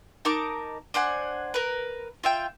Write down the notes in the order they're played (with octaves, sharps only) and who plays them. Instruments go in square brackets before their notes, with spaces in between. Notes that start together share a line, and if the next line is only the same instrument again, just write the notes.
[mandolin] D#4 A#4 A5 D6
D4 C5 F#5 G#5
A#4 B4
F4 E5 G5